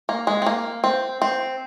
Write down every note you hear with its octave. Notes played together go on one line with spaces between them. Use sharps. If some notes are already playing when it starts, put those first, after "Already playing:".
A#3
G#3
C4
A#3
C4
C4